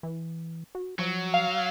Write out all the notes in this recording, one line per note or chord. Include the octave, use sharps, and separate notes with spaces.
E3
F#4
F3 F#3
F5